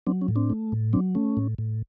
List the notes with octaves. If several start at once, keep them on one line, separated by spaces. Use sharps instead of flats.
F#3 C4 D4
C#4
A2
C4 D4
A3
A2
F#3 C4 D4
A3 C#4
A2
A2